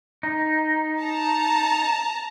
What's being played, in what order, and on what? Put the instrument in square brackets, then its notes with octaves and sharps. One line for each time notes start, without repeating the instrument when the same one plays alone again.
[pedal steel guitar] D#4
[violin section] A5 A#5